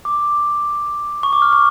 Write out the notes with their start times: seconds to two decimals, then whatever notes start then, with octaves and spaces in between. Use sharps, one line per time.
0.05 D6
1.23 C#6
1.33 D6
1.42 F6
1.53 C#6